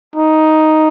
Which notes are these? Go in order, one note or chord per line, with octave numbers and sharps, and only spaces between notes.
D#4